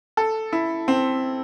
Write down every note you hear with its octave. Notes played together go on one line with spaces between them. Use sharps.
A4
E4
C4